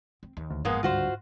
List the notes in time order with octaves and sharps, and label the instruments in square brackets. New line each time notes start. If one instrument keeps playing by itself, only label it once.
[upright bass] C4
D#2
[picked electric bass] D2
[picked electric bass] G1 F2 [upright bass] G#2 [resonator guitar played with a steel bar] G#3 A#3 B3
[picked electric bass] C#2 G2 D3 [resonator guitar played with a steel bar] F4 F#4 C5